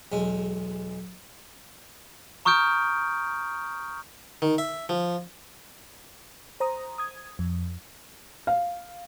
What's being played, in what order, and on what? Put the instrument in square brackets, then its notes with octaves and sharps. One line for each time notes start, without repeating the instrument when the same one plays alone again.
[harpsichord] B1 E2 G#3
[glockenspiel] A#5 C#6 D#6 F6 G6 D7
[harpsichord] D#3
E5
F3
[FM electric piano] C5 A#5 D#6
D#6 G#6
F2
[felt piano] F5